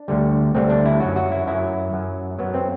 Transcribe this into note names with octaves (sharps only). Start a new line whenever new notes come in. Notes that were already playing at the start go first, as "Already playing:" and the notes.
Already playing: D4
D2 D3 G3
D2 D3 G3 C4
D4
E4
F#2 F#3 F#4
F#4
E4
F#2 F#3 E4
F#2 F#3
F#2 F#3 B3
C4